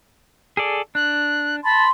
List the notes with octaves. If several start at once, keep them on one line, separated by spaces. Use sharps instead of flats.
G#4 A4 D5
D4 F#6
A5 B5 C6